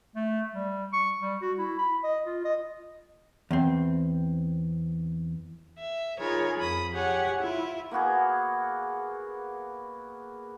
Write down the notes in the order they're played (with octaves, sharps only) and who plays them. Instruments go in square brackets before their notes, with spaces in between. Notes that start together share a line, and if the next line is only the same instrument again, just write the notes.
[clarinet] A3
G3
C#6
G3
F#4
E4
B5
D#5
F4
D#5
[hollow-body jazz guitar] E2 C4
[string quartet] E5
D#4 F4 G#4 A#4 C#5 B5
F2 B5 D#6
G4 G#4 C#5 F#5 G#5
E4 F4 E5
[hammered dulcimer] A#3 B3 F#4 G#4